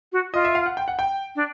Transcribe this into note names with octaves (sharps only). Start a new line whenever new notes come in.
F#4
F4 D#5
E5
F5
F#5
G5
F#5
G5
D4